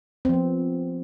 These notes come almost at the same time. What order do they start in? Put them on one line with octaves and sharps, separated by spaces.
C4 F3 B3